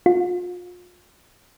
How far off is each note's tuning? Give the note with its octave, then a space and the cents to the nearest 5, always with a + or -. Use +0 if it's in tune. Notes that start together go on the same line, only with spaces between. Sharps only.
F4 +35